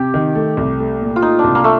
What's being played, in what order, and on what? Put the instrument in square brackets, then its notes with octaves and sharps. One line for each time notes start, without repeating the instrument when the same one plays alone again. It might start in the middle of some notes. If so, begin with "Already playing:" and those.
Already playing: [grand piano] C3 [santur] G4
[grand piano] D#3
A3
C2
A3
A#2
[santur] F4
[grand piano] A3 [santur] D#4
[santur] D4
[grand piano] C2
[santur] A#3
A3